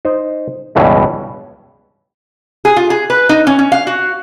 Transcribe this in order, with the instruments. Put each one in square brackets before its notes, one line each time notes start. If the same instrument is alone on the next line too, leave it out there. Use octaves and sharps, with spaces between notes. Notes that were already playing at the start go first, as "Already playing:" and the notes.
[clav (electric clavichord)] D#4 C5
C#2 G2 B2 E3 C#4
[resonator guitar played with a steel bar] G#4
F4
G#4
B4
D#4
C#4
C#4
F5
F#4